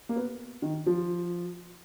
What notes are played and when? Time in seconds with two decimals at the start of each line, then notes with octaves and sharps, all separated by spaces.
0.09 A#3
0.16 B3
0.62 D#3
0.86 F3